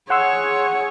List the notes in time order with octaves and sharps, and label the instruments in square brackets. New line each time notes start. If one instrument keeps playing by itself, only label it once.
[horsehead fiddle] G#4 C#5 [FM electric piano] F#5 C6 E6